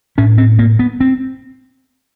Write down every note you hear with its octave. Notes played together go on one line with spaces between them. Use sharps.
A2 C#4
C4
A#3
B3
C4